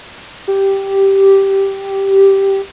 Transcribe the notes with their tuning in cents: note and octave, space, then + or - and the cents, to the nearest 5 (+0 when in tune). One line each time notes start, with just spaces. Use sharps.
G4 -5